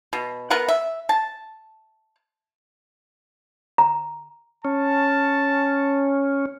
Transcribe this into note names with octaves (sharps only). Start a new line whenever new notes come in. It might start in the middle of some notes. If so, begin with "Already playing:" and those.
B2
B3 A#4 B4 F#5
E5
A5
A#5
C#4 A5